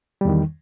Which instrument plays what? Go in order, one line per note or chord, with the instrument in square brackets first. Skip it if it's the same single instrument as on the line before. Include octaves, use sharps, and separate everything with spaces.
[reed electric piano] G3
E2
D#3